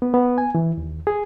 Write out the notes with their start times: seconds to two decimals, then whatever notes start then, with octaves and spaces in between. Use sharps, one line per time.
0.02 B3
0.14 B3
0.38 G#5
0.55 E3
0.78 D#2
1.07 G#4